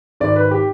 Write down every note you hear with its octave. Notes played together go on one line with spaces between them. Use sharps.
G#1 D5
B4
G4